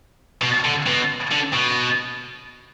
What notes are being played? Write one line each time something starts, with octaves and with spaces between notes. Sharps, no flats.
B2
D3
B2
D3
B2